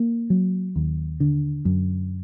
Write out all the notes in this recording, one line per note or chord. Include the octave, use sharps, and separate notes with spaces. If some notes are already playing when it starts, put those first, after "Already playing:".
Already playing: A#3
F#3
D#2
D3
F#2